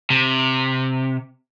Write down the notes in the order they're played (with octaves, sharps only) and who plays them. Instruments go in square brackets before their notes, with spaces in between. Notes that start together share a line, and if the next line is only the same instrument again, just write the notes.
[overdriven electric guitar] C3